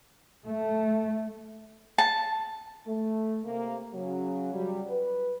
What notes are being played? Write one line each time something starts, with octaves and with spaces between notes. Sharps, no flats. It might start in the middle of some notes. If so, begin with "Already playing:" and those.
A3
A5
A3
C3 A#3
C#3 F#3
F#3 G3
B4